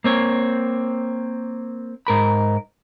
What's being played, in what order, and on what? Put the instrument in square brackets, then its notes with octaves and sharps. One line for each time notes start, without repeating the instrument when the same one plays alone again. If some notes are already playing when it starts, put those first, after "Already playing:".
[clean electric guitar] A#3 C4 C#5
G#2 A#4 B5